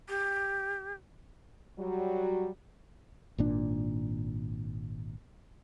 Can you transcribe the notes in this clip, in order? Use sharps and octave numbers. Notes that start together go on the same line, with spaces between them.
G4
F#3 G3 F#4
G#1 A#2 D4